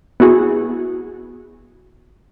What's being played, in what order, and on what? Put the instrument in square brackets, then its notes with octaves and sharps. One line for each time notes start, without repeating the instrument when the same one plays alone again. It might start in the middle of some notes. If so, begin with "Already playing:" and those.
[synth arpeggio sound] B3 E4 F#4 G#4